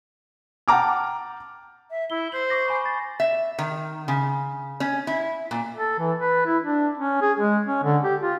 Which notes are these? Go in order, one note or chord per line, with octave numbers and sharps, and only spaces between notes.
F#5 G5 A5 A#5 D6 F6
E5
E4 G7
C5 F#7
C#6 D6 A#6
G#5 B5
B5 A6
E5
D#3
C#3
C#4
E4
A#2
A4
E3
B4
E4
D4
C#4
G#4
G#3
C#4
D3
G4
F4